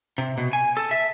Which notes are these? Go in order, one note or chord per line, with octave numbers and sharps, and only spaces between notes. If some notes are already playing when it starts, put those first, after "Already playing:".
C3
B2
G#5
A4
E5